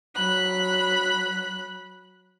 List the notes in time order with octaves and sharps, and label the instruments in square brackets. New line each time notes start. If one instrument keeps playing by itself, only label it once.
[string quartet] F#3 B5 F#6